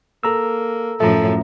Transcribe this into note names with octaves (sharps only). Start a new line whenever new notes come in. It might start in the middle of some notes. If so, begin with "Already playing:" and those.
A#3 A4 A#5 E6
F#2 A2 F3 A4 E5 A#5